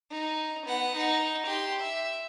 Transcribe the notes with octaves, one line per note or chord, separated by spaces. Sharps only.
D#4
B3 F#5
D#4
G4 C6
E5